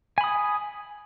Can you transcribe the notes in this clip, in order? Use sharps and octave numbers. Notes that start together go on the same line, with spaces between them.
G#5 B5 D#6